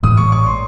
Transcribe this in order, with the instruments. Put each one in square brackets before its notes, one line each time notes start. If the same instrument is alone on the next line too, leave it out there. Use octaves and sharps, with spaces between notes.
[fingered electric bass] A1 A2 E3 G#3 [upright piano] D#6
[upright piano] C#6
C#6
C6